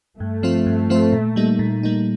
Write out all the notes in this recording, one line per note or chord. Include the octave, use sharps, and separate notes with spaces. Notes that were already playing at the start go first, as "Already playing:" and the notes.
G2 A3
F3 C4 F4 C5
G2
F3 C4 F4 C5
A#2
G3 A#3 D#4
A#2
G3 A#3 D#4